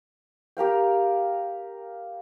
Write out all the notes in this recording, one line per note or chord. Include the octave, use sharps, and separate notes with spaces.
G4 A#4 F5 G5